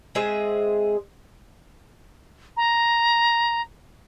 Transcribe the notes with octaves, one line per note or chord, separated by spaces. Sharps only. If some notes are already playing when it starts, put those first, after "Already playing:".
G#3 C4 G#4 E5
A#5